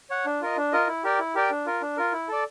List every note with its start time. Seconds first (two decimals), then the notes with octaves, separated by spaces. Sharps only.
0.10 C#5 F#5
0.26 D4
0.41 F4 A#4 D#5
0.57 D4
0.72 F4 A#4 D#5
0.88 E4
1.04 G4 A#4 D5 G5
1.19 E4
1.35 G4 A#4 D5 G5
1.50 D4
1.66 F4 A#4
1.82 D4
1.97 F4 A#4
2.13 E4
2.28 A4 D5